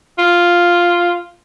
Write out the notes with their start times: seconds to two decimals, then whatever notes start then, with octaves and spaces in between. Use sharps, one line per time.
0.18 F4